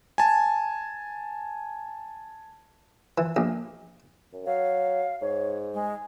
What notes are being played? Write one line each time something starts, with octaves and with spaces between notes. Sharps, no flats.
G#5 A5
E3
A#1
F#2
F#3 F5
G#2 C#5
G#3